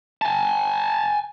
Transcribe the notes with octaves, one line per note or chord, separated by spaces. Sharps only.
G#5 A5